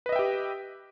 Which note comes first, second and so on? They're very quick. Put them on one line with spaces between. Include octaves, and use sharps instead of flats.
B4 D#5 E5 G5 G4